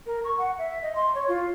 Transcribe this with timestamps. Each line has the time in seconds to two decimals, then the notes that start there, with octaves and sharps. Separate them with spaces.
0.06 A#4
0.24 C#6
0.38 F#5
0.59 E5
0.83 D#5
0.95 C6
1.15 C#5
1.28 F4